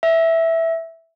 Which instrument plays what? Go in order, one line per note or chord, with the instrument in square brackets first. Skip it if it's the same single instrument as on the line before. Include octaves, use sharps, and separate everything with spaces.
[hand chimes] E5